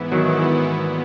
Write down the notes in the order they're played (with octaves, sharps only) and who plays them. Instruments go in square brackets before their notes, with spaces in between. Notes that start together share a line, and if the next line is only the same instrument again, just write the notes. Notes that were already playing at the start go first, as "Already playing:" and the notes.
Already playing: [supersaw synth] G#2 E3 B3 E4
[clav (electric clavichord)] D#3 F#3
[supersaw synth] A#2 G#3 B3